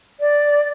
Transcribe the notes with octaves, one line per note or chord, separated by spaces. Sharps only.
D5